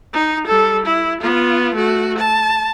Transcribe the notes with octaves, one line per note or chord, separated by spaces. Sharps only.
D#4
G3 A4
E4
B3 F4
A3 F#4
A5